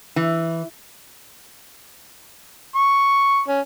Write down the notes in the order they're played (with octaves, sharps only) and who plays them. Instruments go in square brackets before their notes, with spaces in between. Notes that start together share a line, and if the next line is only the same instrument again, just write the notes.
[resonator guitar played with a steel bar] E3
[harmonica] C#6
C#4